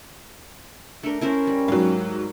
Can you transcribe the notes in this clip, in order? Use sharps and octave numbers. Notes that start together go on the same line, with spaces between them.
A3 D4 A#4
C#4 E4 A#4 C5
G3
G#2 F#3 F5